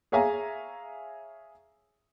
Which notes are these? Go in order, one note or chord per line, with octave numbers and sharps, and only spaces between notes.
G#4 C#5 E5 F5 G#5 A#5